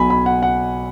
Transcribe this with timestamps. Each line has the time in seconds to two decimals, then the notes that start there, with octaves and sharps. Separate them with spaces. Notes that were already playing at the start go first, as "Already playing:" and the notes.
Already playing: B1 B2 F#3 G#5 B5
0.10 B5
0.26 F#5
0.43 F#5